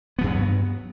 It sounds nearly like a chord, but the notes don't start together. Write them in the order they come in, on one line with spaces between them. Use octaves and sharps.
B3 F3 G2 F#3